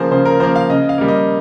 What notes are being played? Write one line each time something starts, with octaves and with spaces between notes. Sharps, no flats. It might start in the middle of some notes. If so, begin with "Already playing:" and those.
Already playing: C#3 F3 A#3 G#4 C5
C#3 C5
A#4
F3 A#3 C5
F5
C#3 D#5
F5
G3 A#3
D#5